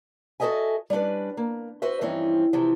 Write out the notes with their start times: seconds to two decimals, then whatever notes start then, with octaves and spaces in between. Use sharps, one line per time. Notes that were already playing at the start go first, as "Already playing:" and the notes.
0.40 F#4 A4 C#5 D#5 E5 G#5
0.90 G3 C#4 D4 B4
1.37 A#3
1.82 F#4 B4 C5 E5
2.01 G2 E3 F3 C4 C#4 D#4
2.53 C3 E3 F3